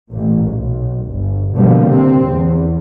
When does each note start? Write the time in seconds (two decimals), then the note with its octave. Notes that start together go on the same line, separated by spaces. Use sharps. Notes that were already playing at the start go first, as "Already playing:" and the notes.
0.11 A1 A#2
0.50 B1
1.09 G1
1.54 B2 D3 F3 G3 A#3 B3
1.85 C3 C4
2.30 E2